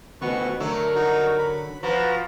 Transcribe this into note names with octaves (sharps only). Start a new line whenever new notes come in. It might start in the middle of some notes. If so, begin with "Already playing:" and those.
D2 B3 F#4 B4 C#6
D3 F#3 A3 A#4
D#4 F#4
B5
F3 F#4 B4 A#5